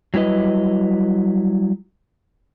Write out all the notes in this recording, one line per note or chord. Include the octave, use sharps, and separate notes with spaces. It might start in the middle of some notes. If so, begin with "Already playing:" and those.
F#3 G3 E4 B4 D#5